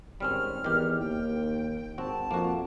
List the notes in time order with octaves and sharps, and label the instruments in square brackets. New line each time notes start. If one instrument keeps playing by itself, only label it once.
[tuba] G#1 [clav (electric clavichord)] G3 C4 C#4 [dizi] F6
[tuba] E2 [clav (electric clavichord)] D#3 G4
[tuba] D#2 [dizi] G5
[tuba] G#1 [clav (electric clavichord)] C4 F#4 [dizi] A5
[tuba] F2 [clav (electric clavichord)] A#3 F#4